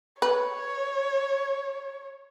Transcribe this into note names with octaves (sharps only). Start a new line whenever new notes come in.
B4 C#5